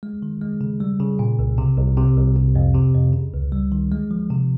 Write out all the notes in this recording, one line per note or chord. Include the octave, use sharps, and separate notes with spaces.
G#3
D#3
G#3
C#3
G3
C#3
A#2
C2
C3
C2
C3
C2
C3
F2
C3
F2
C#3
C#2
G3
D#3
G#3
F3
C3